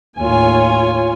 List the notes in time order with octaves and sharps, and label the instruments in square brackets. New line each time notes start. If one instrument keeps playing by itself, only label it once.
[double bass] D#2 A2 [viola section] F4 C#5 G#5